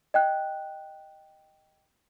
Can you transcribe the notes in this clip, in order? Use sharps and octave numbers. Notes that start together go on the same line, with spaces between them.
D#5 G5 F#6